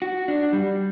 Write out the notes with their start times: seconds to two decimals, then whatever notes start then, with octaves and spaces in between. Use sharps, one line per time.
0.02 F#4
0.28 D4
0.53 G3